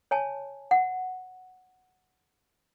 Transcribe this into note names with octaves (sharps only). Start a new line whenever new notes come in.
C#5 G#5 A5
F#5